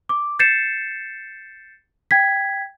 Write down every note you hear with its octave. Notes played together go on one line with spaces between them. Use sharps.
D6
G6 A6 C7 C#7 E7
G5 G#6 B6